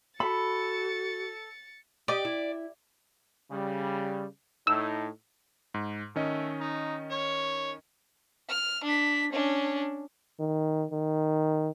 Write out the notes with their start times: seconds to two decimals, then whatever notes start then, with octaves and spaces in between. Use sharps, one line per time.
0.20 F#4 A4 B5 A6 C#7
2.08 G4 D5 D#5
2.25 E4
3.51 C#3 G3
4.67 A2 D#4 E6
5.74 G#2
6.16 D#3 A3 C#4 D#5
6.61 D#4
7.11 C#5
8.49 F6
8.85 D4 B6
9.33 C#4 D4
10.40 D#3
10.91 D#3